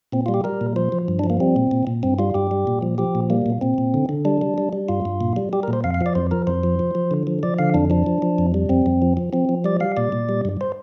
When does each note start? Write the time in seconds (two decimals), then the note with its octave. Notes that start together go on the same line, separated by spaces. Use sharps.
0.12 A#2 C4
0.26 G3 F4
0.34 G4
0.44 G3 A#4
0.61 A#2
0.76 F3 C5
0.92 F3
1.08 G2
1.19 D4
1.24 F3
1.30 A#3
1.40 G3 C4
1.56 A#2
1.71 A#2
1.87 A#2
2.03 G2 C4
2.19 G3 F4
2.34 G2 G4
2.51 G3
2.67 A#2
2.82 F3
2.98 F3 G4
3.15 A#2
3.30 G3 A#3
3.46 A#2
3.61 A#2 C4
3.78 A#2
3.94 D3
4.09 D3
4.25 G3 D4
4.42 G3
4.58 G3
4.73 G3
4.89 G2 F4
5.05 G2
5.21 A#2
5.36 G3
5.53 G3 G4
5.63 A#4
5.68 A#2
5.73 C5
5.84 F2 F5
5.94 F5
6.01 F3
6.06 D5
6.15 F2 C5
6.31 F3 A#4
6.47 F2 C5
6.63 F3
6.79 F3
6.95 F3
7.11 D3
7.27 F3
7.43 F3 D5
7.59 D3 F5
7.74 F2 D4
7.90 F3 D4
8.06 F3
8.22 F3
8.38 F2
8.54 G3
8.69 F2 C4
8.86 F2
9.02 F3
9.17 F3
9.33 F3 C4
9.49 F3
9.64 G3 D5
9.80 G3 F5
9.97 A#2 D5
10.12 A#2
10.29 G3
10.45 G2
10.61 C5